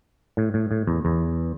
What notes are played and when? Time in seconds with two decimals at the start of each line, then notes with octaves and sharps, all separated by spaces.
0.37 A2
0.54 A2
0.71 A2
0.87 E2
1.05 E2